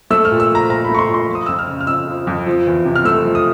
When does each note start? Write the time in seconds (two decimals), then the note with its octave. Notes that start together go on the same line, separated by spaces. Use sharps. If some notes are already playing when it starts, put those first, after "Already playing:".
0.11 A3 E6
0.25 F6
0.31 A#2
0.40 E6
0.51 F3 A#5
0.70 A#2 A#5
0.85 A3 B5
0.95 C#6
0.99 C6
1.09 A#2
1.14 C6
1.28 F3
1.35 D#6
1.46 F2 E6
1.59 F6
1.67 C#3
1.81 F6
1.87 F2 E6
2.07 F3
2.27 F2
2.46 F3
2.67 E2
2.85 C3
2.96 F6
3.05 A3 E6
3.25 F3
3.35 D#6